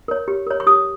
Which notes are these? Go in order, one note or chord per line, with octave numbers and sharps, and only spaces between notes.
A#4 C#5
G4
A#4 C#5
C#6
G4 D#6